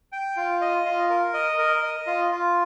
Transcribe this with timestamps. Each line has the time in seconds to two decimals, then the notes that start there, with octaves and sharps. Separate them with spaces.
0.12 G5
0.37 F4
0.61 D#5
0.85 F4
1.10 A#4
1.34 D#5
1.58 A#4
1.83 D#5
2.07 F4
2.31 F4